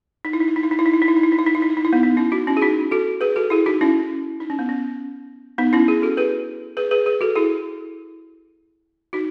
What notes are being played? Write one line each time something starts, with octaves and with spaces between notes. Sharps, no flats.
D#4
E4
D#4
E4
D#4
E4
D#4
E4
D#4
E4
D#4
E4
D#4
E4
D#4
E4
D#4
E4
D#4
E4
D#4
E4
B3 D#4
B3 D#4
C#4 E4
D#4 F#4
C#4 E4
G#4
D#4 F#4
F#4 A4
G#4 B4
F#4 A4
E4 G#4
D#4 F#4
C#4 E4
D#4
C#4
B3
C#4
B3 D#4
C#4 E4
E4 G#4
F#4 A4
G#4 B4
G#4 B4
G#4 B4
G#4 B4
F#4 A4
E4 G#4
D#4 F#4